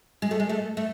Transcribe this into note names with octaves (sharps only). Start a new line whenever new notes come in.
G#3
A3
G#3
A3
A3